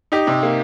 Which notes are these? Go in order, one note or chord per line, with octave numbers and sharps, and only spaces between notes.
D#4 G4
C3
A#3